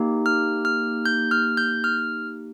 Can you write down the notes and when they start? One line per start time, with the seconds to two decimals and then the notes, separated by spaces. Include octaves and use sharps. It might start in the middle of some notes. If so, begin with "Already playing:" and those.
Already playing: A#3 D#4 G4
0.26 F6
0.65 F6
1.06 G6
1.31 F6
1.57 G6
1.84 F6